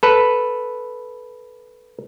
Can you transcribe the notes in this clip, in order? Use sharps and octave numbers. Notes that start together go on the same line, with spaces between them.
A4 B4